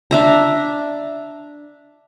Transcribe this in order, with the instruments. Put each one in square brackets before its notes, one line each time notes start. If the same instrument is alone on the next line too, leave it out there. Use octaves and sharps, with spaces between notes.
[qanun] D4 E5 A#5